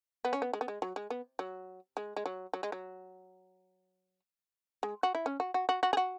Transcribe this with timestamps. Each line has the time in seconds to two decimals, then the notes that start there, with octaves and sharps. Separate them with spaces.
0.25 B3
0.33 C#4
0.42 B3
0.53 G#3
0.61 B3
0.68 G#3
0.82 F#3
0.96 G#3
1.10 B3
1.39 F#3
1.97 G#3
2.16 G#3
2.26 F#3
2.53 F#3
2.63 G#3
2.72 F#3
4.83 G#3
5.03 F#4
5.15 E4
5.26 C#4
5.40 F#4
5.54 F#4
5.69 F#4
5.83 F#4
5.93 G#4
5.97 F#4